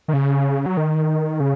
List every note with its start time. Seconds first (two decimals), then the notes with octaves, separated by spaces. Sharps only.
0.08 D#3
0.13 C#3
0.66 F#3
0.77 D#3
1.40 C#3